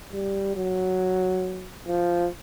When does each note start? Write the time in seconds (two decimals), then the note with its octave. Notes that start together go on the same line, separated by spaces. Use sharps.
0.13 G3
0.56 F#3
1.87 F3